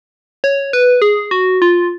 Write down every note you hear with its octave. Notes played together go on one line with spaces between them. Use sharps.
C#5
B4
G#4
F#4
F4